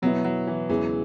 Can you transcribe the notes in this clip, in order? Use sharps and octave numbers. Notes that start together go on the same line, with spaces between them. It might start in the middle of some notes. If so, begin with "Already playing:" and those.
B2 F#3 B3 E4
F#3
E3
E2 C#3 E3 G#3 E4